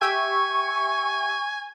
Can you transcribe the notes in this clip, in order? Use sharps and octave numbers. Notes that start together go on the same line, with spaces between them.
G4 E5 G5 G#5 C#6